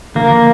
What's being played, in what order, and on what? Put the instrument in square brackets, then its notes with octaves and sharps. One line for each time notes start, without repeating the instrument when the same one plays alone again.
[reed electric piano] D3 F3 [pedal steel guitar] A#3